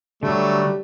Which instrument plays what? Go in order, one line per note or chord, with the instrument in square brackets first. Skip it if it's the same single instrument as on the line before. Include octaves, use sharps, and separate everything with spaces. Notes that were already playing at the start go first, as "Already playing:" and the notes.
[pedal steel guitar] D3 [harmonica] F#3 A3 [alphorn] G3